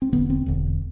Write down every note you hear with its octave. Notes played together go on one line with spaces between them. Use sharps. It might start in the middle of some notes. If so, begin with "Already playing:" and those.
C4
E1 E2 D3 B3
C4
E1 E2 D3